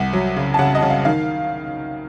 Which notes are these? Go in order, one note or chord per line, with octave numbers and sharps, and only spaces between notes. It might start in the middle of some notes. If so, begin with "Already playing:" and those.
Already playing: C2 F#5
F#3
C#3
A5
C#3 F#5
D#5
C#3
F5
D#3 F5